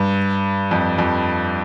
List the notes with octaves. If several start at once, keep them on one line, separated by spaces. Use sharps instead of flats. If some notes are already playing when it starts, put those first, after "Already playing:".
Already playing: G2
F2
F2